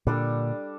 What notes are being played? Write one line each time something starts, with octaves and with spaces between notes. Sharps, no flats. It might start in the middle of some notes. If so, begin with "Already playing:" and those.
A#2 D3 G3 D4 A4